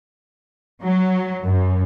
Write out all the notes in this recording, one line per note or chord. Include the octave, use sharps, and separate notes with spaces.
F#3
F#2